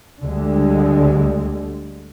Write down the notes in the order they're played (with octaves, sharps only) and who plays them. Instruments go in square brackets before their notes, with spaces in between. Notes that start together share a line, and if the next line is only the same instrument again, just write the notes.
[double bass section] D2 D3 G3 G#3